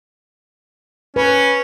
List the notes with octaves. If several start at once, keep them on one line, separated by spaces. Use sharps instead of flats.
C#4 B4